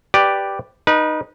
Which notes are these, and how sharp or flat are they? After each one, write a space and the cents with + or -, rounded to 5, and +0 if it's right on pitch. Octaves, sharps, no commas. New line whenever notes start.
G4 +0 B4 +0 D5 +0
D#4 -10 B4 -30